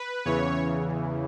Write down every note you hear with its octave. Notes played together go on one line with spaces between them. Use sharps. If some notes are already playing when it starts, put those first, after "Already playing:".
Already playing: B4
E2 C#3 E3 C#5